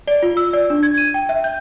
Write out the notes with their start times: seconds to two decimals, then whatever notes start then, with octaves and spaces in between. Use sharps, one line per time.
0.07 D5
0.23 F4
0.37 E6
0.53 D5
0.70 D4
0.83 G#6
0.98 D#7
1.14 G5
1.29 E5
1.44 G6